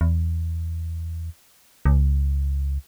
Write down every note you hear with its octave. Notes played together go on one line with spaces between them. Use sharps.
E2
C#2